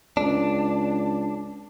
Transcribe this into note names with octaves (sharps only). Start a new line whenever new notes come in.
C#2 D4